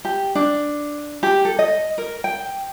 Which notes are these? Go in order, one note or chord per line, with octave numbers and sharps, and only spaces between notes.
G4
D4
G4
A4
D#5
A#4
G5